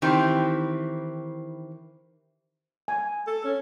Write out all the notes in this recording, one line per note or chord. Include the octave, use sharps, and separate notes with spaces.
D#3 E3 C4 E4 G4
G#5
A4
C#4